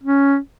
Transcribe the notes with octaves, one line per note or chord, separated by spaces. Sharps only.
C#4